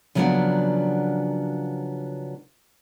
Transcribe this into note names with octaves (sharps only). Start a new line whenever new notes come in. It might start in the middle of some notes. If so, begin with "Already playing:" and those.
C#3 F3 F#3 A#3 B3 D4